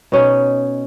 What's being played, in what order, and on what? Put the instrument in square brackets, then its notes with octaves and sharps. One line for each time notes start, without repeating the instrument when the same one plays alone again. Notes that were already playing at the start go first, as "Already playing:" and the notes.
[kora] B2 C#4 D#4